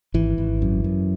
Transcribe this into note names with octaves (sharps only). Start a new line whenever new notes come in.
G#1 E3
G#1
F#2
F#2